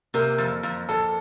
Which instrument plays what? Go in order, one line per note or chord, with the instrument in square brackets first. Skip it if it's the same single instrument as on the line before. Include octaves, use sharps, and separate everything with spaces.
[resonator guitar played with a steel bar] C3 [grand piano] A#3 A#4
[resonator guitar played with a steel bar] F2
F2
[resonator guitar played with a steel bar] F2 [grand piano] A4